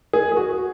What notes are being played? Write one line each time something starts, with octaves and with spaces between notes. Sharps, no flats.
G#4
G#4
F#4